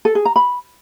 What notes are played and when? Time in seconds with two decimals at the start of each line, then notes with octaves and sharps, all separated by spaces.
0.05 A4
0.15 G#4
0.25 A#5
0.36 B5